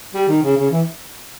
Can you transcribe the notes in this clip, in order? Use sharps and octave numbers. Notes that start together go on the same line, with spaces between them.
G3
D#3
C#3
C#3
E3